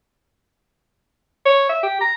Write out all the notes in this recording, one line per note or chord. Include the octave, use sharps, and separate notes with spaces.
C#5
E5
G4
A#5